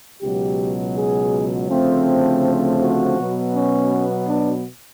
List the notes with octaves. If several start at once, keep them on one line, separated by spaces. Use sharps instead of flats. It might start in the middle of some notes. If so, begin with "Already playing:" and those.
C#2 B2 F#3 G4
G#4
D2 C#3 F3 A3 C4
F#4
B2 F#3 B3
C#4
D4